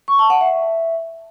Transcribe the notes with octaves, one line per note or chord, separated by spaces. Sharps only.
C#6
A5
F#5
E5